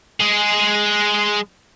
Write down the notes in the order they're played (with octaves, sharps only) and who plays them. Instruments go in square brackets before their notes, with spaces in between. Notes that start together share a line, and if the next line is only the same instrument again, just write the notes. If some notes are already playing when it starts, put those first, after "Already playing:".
[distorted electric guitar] G#3 G#4